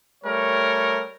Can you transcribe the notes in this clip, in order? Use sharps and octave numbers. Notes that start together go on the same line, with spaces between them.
G3 A3 A#4 C#5